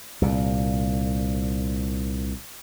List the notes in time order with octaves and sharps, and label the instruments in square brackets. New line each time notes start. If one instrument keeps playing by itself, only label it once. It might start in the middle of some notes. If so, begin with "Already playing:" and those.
[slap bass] C2 A#2